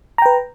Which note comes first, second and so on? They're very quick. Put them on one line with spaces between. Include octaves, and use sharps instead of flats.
A#5 G5 B4